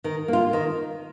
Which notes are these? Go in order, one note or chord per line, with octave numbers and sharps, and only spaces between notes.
D#3
A#3 F4
D#3